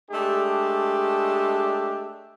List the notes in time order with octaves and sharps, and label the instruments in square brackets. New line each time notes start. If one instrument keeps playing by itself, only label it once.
[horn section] G#3 A3 D4 G4